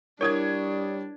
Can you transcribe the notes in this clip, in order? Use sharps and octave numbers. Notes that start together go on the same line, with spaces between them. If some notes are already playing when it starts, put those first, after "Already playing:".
G3 D4 E4 A#4 C#5 D#6 G#6